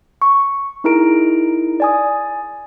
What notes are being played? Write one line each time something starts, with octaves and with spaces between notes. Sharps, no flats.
C#6
D#4 E4 G#4 A#4 A#5 D7
D5 G#5 D#6